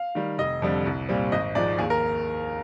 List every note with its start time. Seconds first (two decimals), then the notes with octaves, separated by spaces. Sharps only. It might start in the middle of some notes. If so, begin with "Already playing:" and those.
Already playing: F5
0.15 D#3 G3
0.38 F1 D#5
0.62 F2 D3 G3
0.85 C2
1.09 A#2 G3 C4
1.32 G#1 D#5
1.55 G#2 F3 D5
1.78 D#2 G#4
1.90 A#4